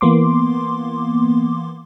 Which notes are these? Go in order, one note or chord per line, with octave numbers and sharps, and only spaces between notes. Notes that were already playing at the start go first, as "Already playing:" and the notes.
E3 A#3 B3 C6 D6